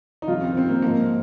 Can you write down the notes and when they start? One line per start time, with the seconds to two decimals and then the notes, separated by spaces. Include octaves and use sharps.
0.22 D#4
0.28 F2 C3 D#3 F4
0.41 C4
0.57 C4
0.69 A#3
0.82 G#2 F3 A#3